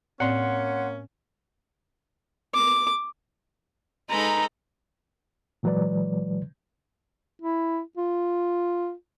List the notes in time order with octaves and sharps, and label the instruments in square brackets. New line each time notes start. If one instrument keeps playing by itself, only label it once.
[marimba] A2 C4 D5 [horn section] A#3 C#4 [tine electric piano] F#5 C6
[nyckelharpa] D6
[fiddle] G#3 A4 [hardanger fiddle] D#4 B4 [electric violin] A#5
[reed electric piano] A#2 E3 F#3 G#3 B4 D5
[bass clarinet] E4
F4